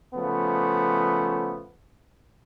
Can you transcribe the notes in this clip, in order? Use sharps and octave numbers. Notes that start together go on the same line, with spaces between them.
C#3 F3 A3 B3